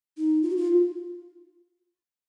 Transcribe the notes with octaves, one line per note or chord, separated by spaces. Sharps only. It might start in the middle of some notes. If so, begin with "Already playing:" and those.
D#4
F4
F#4
F4